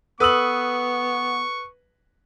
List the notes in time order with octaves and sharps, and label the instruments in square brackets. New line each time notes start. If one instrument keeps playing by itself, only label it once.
[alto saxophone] B3 [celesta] A4 D#6 E6 [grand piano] B4 F#7 [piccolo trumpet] C#6